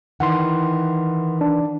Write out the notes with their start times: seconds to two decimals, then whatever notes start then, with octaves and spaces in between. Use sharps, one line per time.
0.20 D#3 E3 F#5 C6
1.41 D4